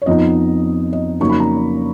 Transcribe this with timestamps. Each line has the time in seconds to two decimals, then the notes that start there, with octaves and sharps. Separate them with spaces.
0.02 C#5
0.06 F2 F3 B3 D#4 D#5
0.93 D#5
1.20 F2 C#3 F#3 A#3 D#4 C#6
1.29 B5
1.40 A#5